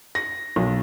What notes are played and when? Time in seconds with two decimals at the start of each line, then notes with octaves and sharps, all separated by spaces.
0.15 A#6
0.56 B1